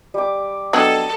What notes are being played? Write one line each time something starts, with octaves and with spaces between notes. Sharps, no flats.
G3 D6
F#3 B3 D4 A4 D#5 G5 E6 G#6